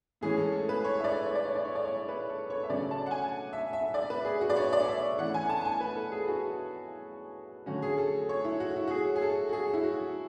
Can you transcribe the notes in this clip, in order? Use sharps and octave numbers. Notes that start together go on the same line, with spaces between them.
A2 E3 G#3 C#4 G#4
A4
A4
B4
C#5
E5
D5
C#5
D5
C#5
D5
C#5
D5
C#5
B4
A4
C#5
E5
C#3 F#3 A3 C#4 D5
A5
F#5
G#5
E5
E5
D5
B4
G#4
F#4
D5
C#5
D5
E5
E3 A3 C#4 F#5
G#5
A5
A5
G#5
B4
A4
G#4
F#4
D3 F#3 A3 C#4 F#4
G#4
A4
C#5
E4
F#4
E4
F#4
G#4
G#4
A4
F#4
G#4
E4
F#4